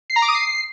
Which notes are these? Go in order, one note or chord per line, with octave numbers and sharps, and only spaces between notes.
C7
A#5
D6
D#6
C7